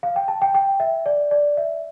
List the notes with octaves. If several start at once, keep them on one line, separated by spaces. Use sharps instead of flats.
F5
G5
A5
G5
G5
E5
D5
D5
E5